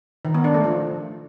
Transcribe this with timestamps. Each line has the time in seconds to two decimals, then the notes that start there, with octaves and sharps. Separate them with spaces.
0.25 D#3
0.34 B3
0.44 D4
0.54 A3
0.64 F3